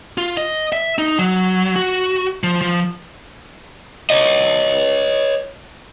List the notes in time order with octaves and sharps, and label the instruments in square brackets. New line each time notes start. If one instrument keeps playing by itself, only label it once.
[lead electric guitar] F4
D#5
E5
D#4
F#3
F#4
F3
F3
C#5 D#5